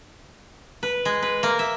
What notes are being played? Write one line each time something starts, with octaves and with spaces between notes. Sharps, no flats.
B4
G#3
B4
A#3
E5